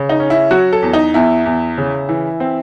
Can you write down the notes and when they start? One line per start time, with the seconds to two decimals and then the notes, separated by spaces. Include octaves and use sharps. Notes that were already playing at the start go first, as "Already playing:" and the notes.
Already playing: C#3
0.09 D#4
0.20 C#4
0.30 E4
0.51 F#3 F#4
0.73 A4
0.82 E2
0.93 D#4
1.14 E2 E4
1.46 E2
1.78 C#3
2.09 E3
2.40 C4